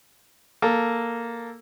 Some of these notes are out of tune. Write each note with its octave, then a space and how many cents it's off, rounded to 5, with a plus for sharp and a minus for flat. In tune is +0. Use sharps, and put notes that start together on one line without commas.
A#3 +0 A4 +10